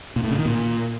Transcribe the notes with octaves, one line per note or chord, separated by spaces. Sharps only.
A#2
A2
C#3
D#3
A#2